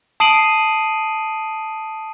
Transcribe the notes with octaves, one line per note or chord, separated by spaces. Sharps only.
A5 D#6 C7 D7 D#7 F#7